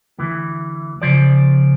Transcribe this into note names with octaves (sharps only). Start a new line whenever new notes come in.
D2 E3
C#3 F3 D5